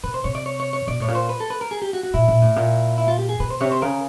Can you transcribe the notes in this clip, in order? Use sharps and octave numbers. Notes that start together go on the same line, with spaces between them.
C3 B4
C5
C3 C#5
D5
C#5
C#5
C#5
B2 D5
A2 C#5
A#2
C5
B4
A4
B4
A#4
G#4
G4
F#4
F#4
A#2 E4
A#2
A2
A#2
E4
F4
G4
G#4
B2 B4
C5
C3 C#5
C5
C#3 A#4